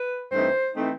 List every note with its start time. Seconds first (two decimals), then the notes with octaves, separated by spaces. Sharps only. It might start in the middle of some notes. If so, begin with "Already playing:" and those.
Already playing: B4
0.32 G2 E3 A3 C4 D#4 C5
0.76 E3 A3 C4 D#4